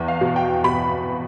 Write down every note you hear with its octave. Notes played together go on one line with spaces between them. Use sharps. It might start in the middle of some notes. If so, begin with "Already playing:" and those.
Already playing: E2
F5
B2
G5
B2 B5